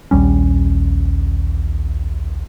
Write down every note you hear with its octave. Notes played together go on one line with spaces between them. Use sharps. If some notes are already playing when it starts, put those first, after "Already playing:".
A#1 D#2 G3 C#4